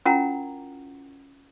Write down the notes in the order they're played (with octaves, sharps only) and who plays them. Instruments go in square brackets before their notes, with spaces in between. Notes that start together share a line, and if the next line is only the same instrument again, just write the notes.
[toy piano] C#4 E4 F4 A#4 F#5 A#5